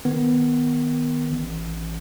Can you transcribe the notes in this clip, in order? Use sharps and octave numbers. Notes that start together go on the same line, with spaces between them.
D#3 B3
A1